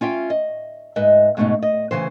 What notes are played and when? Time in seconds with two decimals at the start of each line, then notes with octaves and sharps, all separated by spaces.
0.01 C#4 F4 E5 G5
0.30 D#5
0.96 G#2 B4 D#5 E5
1.37 G#2 B2 A3 C4 C#4 D#4
1.63 D#5
1.91 D2 C#3 E3 C5